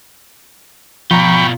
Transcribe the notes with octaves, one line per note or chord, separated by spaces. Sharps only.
B2 F3 F4 G5 A#5 B5 C#6